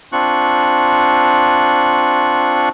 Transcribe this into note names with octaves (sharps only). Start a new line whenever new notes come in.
C4 D4 F4 C#6 F#6